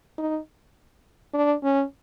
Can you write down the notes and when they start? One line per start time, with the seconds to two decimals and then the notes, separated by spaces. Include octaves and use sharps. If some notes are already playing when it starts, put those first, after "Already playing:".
0.18 D#4
1.34 D4
1.63 C#4